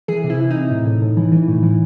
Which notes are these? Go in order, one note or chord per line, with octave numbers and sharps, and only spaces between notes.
E3 G#4
C3
E4
E3
D#4
C3
A2
A2
A2
E3
E3
A2
E3